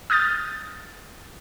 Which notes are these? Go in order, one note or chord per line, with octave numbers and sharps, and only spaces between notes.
D#6 F6 G6 A6